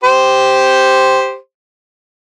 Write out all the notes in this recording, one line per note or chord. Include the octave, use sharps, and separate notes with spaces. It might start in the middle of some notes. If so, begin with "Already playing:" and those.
G4 C5